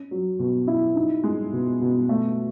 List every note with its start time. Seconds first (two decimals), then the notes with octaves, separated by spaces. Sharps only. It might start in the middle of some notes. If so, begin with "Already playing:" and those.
Already playing: C#4
0.11 F#3
0.39 B2
0.67 E4
0.96 D#4
1.24 G#3
1.53 B2
1.81 B2
2.09 A3